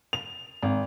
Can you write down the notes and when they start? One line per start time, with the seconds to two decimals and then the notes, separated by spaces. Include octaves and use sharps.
0.13 F7
0.63 G#1